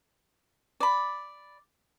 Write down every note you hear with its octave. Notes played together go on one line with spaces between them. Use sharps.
D5 B5